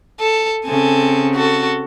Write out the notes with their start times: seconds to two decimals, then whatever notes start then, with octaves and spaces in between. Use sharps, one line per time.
0.20 A4
0.66 C#3 C4 A4 G#5
1.35 F#4 A4